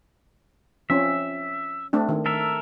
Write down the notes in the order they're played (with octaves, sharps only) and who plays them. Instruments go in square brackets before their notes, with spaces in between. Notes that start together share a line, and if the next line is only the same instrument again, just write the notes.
[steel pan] F3 C4 C#4 [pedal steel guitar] E5
[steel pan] A3 C4 D4
D#3
[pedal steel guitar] A4 A#4 E5